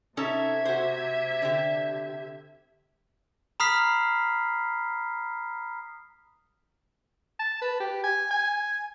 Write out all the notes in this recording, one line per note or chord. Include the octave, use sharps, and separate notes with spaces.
C3 C#4 D#4 A4 E5 G#6
F#4 C5
D3 G4
A#5 B5 D#6 F6 B6 C7
A5
B4
G4
G#5
G#5